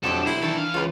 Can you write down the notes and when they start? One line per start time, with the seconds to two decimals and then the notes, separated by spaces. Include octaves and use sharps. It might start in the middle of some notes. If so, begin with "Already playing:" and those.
0.03 B1 F2 F#3 A3 D4 G4 A4
0.26 E4 C5
0.42 B1 D#3 E3 D4 A4
0.58 F5
0.74 C#2 F4 B4